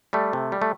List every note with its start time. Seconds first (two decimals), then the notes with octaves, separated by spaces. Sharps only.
0.13 G3 A3
0.33 C3
0.52 G3
0.62 A3